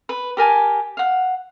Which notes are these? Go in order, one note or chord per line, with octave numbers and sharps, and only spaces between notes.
B4
G4 A#4 G#5 A5
F5 F#5